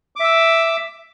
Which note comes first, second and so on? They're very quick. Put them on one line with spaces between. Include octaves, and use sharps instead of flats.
D6 E5 E6